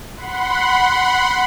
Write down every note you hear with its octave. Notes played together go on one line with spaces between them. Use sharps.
F#5 B5 C6